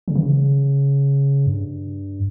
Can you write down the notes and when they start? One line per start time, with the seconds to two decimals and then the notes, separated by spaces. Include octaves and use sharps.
0.08 C#3
0.15 D#3
0.23 C#3
1.47 G2